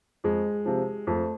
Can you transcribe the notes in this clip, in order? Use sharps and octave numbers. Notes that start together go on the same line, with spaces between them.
F2 G#3
C3 F3
F2 A3